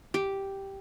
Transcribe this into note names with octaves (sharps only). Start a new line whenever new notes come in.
G4